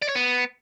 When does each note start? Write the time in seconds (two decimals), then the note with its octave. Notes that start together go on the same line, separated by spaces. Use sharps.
0.02 D5
0.09 C#5
0.15 B3